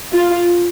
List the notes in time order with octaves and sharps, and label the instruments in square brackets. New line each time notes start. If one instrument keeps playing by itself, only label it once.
[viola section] F4